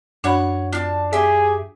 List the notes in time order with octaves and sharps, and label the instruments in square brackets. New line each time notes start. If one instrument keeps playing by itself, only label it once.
[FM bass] F#2 [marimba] D4 F#4 B5 [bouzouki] C#5 F#5
[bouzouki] D4 A5 [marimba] F4
[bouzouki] G4 E5 [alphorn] G#4